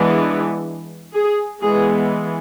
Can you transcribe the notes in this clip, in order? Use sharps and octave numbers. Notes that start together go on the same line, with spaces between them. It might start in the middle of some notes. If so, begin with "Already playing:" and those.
Already playing: E3 G#3 B3 D4
G#4
E3 G#3 B3 G#4